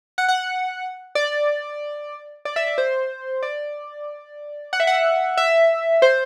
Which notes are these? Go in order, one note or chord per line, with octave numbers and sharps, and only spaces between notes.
F#5
F#5
D5
D5
E5
D5
C5
D5
F#5
E5
F#5
E5
C5